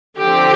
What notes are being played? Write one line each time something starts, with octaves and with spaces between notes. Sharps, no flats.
D3 F3 C4 G4